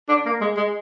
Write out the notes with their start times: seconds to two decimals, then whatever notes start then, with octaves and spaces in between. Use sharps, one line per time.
0.09 D4
0.26 A#3
0.41 G#3
0.57 G#3